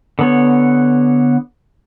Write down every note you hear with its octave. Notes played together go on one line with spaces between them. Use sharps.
D3 B3 C#5